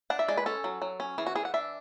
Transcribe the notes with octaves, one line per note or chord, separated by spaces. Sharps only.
D4 F#5
E5
G#3 D5
B4
C#4 A4
F#3
F#3
C#4
E3 G#4
F#4
E3 G#4
F#5
D4 E5